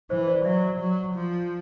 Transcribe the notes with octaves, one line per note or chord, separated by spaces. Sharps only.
E3 C5
C5 D5
F#3 D5 E5
F#3
F3